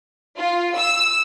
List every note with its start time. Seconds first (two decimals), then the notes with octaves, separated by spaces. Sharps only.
0.38 F4
0.76 E6